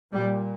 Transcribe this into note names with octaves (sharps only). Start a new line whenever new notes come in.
A#2 G3